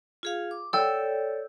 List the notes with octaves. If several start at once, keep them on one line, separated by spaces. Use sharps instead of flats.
F4 G#4 F5
D6
A4 C#5 D5 G5 E6